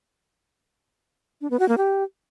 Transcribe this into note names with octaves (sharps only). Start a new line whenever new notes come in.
D4
B3
F#4
A#3
G4